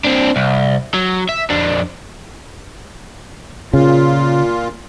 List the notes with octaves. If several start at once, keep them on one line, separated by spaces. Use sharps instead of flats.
C4 D4
C2
F#3
E5
F2 D4
A#2 C#3 F4